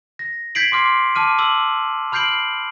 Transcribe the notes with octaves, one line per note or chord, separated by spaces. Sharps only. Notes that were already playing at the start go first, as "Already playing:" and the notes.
A#6
G6 G#6 B6 C7 D7 F#7
C6 D6 F6 C7
A5 D6 F6 D#7
D6 E6 F#7
B5 F6 G6 C7 D7 F#7